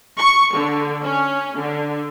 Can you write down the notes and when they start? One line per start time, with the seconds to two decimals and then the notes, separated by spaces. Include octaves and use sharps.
0.18 C#6
0.55 D3
1.04 C#4
1.58 D3